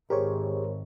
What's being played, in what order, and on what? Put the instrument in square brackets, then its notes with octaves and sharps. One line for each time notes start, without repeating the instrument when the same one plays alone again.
[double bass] G#1 [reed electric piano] G4 G#4 [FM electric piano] A#4 C5 C#5